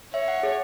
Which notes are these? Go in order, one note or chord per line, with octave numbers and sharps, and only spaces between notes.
C#5 E5
F#5
G#4